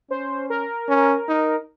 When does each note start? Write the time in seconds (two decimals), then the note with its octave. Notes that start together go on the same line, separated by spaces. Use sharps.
0.10 C#4 C5
0.50 A#4
0.89 C#4
1.29 D#4